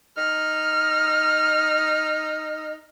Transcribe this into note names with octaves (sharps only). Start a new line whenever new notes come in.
D#4 F6